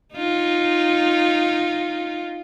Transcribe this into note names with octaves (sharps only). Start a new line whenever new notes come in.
D#4 F4